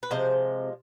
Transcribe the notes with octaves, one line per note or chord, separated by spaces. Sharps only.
B4
C3 F3 G#3 C5